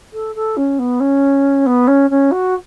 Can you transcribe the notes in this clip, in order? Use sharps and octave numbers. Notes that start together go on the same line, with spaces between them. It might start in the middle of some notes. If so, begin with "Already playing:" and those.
A4
A4
C#4
B3
C#4
B3
C#4
C#4
F#4